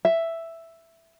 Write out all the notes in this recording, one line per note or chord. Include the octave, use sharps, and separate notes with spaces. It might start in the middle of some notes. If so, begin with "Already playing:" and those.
E5